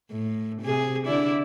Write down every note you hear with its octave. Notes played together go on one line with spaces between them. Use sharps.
A2
C3 G#4
D3 E4 D5